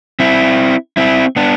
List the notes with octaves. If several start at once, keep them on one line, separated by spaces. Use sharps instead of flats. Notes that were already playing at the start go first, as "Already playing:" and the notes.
C4 E4
C4 E4
B3 D4